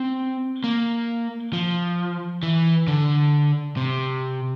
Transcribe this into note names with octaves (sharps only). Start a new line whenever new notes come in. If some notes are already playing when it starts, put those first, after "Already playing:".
Already playing: C4
A#3
F3
E3
D3
C3